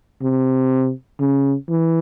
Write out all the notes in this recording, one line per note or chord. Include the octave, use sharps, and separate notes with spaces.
C3
C#3
E3